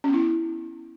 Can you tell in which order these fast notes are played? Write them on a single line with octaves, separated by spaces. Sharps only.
C#4 B3 E4